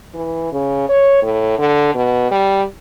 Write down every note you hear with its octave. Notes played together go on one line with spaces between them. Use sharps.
E3
C#3
C#5
A2
D3
B2
G3